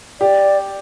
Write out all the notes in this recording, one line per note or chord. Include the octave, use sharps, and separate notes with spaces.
G4 D5